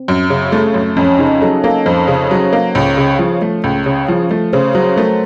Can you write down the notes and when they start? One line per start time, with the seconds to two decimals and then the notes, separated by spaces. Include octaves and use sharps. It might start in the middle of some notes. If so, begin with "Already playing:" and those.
Already playing: C4
0.08 F#2
0.30 C#3
0.52 A3
0.74 F#2
0.96 F2 C#4
1.19 C#3 D#4
1.41 F#3 A4
1.63 A#3 A4
1.86 F2 C5
2.08 C#3
2.31 F#3
2.53 A#3
2.75 C#2 C#5
2.97 C#3
3.19 F3
3.42 A3
3.64 C#2
3.86 C#3
4.08 F3
4.31 A3
4.53 C#3 C5
4.75 F#3 C5
4.97 A3 A#4